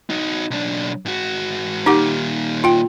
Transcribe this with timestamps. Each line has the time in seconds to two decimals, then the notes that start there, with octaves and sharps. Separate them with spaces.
0.10 D#4 F#4
0.51 B1 D4
1.05 G#2 F#4
1.86 A#2 D#3 D#4 G4 F#5
2.64 F4 G5